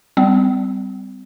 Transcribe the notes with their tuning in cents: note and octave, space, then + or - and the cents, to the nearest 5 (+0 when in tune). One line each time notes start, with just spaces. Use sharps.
G3 +0 C4 -40